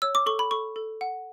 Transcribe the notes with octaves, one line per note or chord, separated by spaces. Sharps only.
C#5 E6
D6
A4 C#6
B5
A4 C#6
A4
F#5